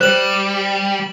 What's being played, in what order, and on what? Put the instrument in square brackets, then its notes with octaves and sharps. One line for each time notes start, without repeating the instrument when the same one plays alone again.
[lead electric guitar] G3 [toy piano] C5 [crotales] E7 F#7